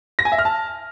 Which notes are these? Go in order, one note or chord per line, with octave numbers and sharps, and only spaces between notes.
A#6
G#5
E5
F6
A5